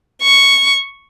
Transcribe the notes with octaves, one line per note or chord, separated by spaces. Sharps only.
C#6